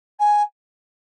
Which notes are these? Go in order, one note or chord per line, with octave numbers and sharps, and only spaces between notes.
G#5